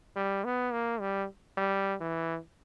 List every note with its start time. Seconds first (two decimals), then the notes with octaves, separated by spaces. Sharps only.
0.16 G3
0.45 B3
0.72 A#3
1.00 G3
1.57 G3
2.00 E3